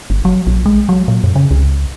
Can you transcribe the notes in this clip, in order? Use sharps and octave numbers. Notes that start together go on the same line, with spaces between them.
G1
F#3
A#1
G#3
F#3
A#2
F#2
C#3
C#2